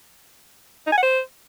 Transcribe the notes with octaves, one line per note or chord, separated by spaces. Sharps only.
D#4
G#5
F#5
C5